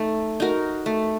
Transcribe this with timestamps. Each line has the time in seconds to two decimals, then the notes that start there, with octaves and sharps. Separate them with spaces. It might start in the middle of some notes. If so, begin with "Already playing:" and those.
Already playing: A3 D#4
0.40 D#4 F#4 A#4
0.86 A3